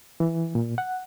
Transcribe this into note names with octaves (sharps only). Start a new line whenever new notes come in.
E3
A#2
F#5